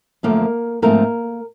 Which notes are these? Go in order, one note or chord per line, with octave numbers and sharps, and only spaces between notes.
F#2 D3 F3 A3 A#3 A#4
G#2 F3 A3 A#3 C4 A#4